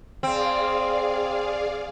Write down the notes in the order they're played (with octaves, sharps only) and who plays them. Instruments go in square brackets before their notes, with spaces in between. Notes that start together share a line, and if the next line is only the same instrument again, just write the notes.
[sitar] C4 [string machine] G#4 D5 F5